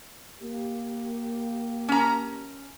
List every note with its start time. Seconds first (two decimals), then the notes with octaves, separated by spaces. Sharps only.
0.41 A#3 G4
1.89 C#4 A#5